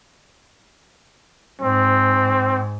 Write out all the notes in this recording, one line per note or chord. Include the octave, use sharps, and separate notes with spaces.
G#2 C4